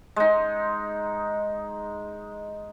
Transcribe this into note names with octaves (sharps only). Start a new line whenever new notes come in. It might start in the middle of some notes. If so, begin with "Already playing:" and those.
G#3 D#4